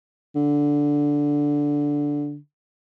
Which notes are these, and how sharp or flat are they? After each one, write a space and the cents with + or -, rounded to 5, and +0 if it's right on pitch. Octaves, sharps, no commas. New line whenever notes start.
D3 -10